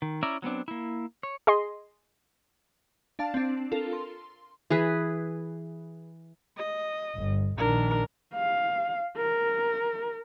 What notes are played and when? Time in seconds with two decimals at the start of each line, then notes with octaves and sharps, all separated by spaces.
0.02 D#3
0.23 C#4 E4 D5 E5 A#5
0.42 F#3 B3 C4 D4
0.68 A#3 E4
1.23 C#5
1.47 G#4 D#5 C6
3.19 D4 F5 A5
3.34 C4 D4
3.72 F4 A4 A#4
3.93 C6
4.70 E3 G#4 B4
6.58 D#5
7.15 G1
7.57 A#1 D#3 D4 A#4
8.34 F5
9.17 A#4